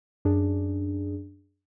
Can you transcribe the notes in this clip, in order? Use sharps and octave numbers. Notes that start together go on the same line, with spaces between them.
F#2 D4 G#4